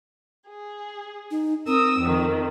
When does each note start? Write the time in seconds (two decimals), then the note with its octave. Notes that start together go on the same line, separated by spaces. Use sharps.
0.48 G#4
1.31 D#4
1.67 C4 A#4 D#6 E6
1.99 F2 D#3